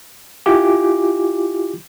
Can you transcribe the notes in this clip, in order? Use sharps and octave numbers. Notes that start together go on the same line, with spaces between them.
E4 F4 G4 G#5 D6